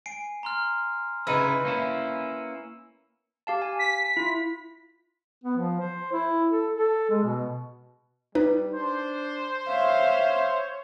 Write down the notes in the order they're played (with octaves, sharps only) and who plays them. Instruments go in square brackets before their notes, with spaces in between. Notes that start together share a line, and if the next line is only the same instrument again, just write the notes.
[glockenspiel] G#5 C7 D7
A#5 C6 F6
[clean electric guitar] C#3 D#4 E4 [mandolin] B4 [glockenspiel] E6
[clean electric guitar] A#3 C#4 E4
[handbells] G4 F5 A5
G#5
[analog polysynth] B6
[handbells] E4 F4
[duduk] B3
F3
C5
E4
A4
A4
G#3
B2
[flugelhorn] G3 [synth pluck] D#4 B4
[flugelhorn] D4 [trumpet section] C5
[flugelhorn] C#5 [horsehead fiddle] E5 F5